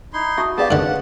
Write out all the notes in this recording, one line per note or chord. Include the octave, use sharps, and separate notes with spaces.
D#4 E4 C6
F#4 E5 A5 D#6
B3 G4 G#4 D5 F5 A5
F#2 D3 F#5